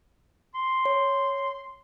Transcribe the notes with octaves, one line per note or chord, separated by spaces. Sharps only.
C6
C#5